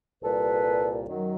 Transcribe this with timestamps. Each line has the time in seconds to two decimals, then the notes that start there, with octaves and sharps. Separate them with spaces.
0.22 C2 A#2 G3 A4 B4
1.08 F#2 D#3 F#3